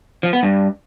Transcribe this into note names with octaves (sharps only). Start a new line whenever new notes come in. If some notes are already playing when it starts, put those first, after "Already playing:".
F3
B3
G2